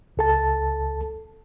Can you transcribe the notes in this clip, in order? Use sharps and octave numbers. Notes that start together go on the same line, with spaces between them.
C#2 A4 A5